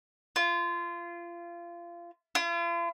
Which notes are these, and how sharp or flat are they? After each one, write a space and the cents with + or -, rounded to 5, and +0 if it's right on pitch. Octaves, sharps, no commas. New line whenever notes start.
F4 -25
F4 -45